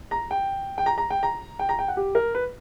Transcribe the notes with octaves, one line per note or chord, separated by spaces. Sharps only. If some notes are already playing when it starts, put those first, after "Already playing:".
A#5
G5
G5
A#5
A#5
G5
A#5
G5
A#5
G5
F#5
G4
A#4
B4